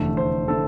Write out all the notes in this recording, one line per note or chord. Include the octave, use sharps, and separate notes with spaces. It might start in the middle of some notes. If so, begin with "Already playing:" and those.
Already playing: F1 E2 D3 A3
C5
D3 A3 A4